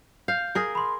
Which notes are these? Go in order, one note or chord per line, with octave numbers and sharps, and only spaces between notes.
F5 G6
G#4 A#4
B5 C6